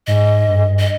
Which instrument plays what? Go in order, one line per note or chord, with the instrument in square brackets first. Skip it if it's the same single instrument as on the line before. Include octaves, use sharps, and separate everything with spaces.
[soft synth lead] G#2 [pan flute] D#5
[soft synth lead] G2
[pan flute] D#5